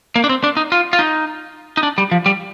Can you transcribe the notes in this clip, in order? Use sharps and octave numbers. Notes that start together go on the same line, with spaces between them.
A#3
D4
C4
D4
D#4
F4
F4
D#4
D#4
D4
G3
F3
G3